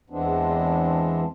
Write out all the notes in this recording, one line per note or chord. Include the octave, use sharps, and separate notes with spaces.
E2 E3 G#3 B3 C4 D4